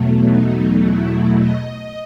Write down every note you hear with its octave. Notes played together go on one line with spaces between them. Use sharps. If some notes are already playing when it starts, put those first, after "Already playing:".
Already playing: E2 B2 F#3 A3
D#4
E4
D#5